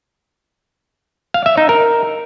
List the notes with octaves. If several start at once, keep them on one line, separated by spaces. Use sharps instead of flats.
F5
E5
D#4
A#4